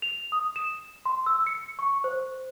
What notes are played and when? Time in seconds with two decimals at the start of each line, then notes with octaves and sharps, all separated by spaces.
0.02 F7
0.32 D#6
0.56 E7
1.06 C6
1.26 E6
1.47 C#7
1.79 C#6
2.04 C5